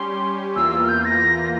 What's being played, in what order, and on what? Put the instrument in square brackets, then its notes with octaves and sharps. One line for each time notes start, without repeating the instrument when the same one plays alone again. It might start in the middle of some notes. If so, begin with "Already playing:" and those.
Already playing: [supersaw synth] G3 C#4 G4 [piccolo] C6
[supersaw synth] E2 E3 A#3 F4 [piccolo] E6
[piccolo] E6
F6
G6
A#6